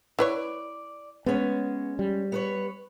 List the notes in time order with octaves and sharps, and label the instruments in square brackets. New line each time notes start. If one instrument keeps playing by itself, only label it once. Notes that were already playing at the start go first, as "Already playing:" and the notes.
[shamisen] E4 B4 C#5 [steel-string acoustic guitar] D5
[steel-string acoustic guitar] G#3 C#4 [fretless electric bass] B3
[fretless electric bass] G3
[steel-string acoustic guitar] B3 B4 C#5